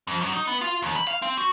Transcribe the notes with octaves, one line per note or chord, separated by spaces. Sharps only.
F2
F#2
D#4
B3
F4
D#2
B5
F5
C4
F#4